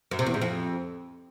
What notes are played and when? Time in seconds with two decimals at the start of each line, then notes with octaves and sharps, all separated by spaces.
0.11 F#2
0.19 C3
0.26 E2
0.34 G#2
0.41 F2